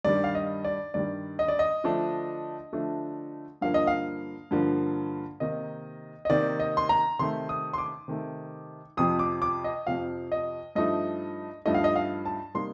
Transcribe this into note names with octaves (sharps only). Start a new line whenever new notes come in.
G2 D#3 G3 D5
F5
D#5
D5
G2 D#3 G3 D5
D#5
D5
D#5
D3 F3 A3 D4
D3 F3 A3 D4
G2 D3 F3 A#3 F5
D#5
F5
G2 D3 F3 A#3
C3 D#3 A#3 D#4 D#5
D#5
C3 D#3 A#3 D#4 D5
D#5
C6
A#5
C3 D#3 A3 C6
D#6
C6
D6
C3 D#3 A3
F2 C3 F3 D#6
D6
D6
D#5
F2 C3 F3 F5
D#5
G2 F3 A3 D#4 D#5
G2 F3 A3 D#4 D#5
F5
D#5
F5
A5
C3 G3 A#3 D#4 C6